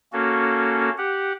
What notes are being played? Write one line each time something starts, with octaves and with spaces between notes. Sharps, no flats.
A#3 C#4 F#4 A4
G4 F#5